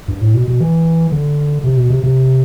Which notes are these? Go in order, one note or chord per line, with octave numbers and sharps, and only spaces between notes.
G2
A2
B2
B2
E3
D3
C3
B2
C3
C3